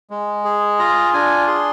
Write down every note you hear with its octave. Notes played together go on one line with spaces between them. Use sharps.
G#3
G#4
F4 A#5
D4 G#5
G#4 C6